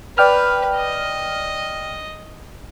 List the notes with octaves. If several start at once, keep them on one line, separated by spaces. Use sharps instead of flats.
B4 D5 G5 F6
D#5